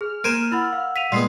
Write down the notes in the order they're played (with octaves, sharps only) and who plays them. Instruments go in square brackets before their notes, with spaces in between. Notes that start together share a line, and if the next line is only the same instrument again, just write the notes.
[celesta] G#4 [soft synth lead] F6
[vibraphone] A#3 [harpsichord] A#4 C5 G#5 [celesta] D#7 E7
[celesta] E4 B5 A6 [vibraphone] F#5 E6
[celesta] F5
[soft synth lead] F5 [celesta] B6 D#7 F7
[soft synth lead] A#2 [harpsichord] G3 G#3 B3 [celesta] C6 C7